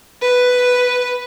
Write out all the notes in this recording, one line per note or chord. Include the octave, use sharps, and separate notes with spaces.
B4